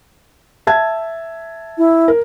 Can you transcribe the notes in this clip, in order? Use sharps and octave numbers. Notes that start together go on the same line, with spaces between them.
E5 A5 G#6
E4
A#4